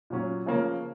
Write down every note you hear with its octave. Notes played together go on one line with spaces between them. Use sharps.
A#2 F#3 C#4
C#3 F3 A#3 C#4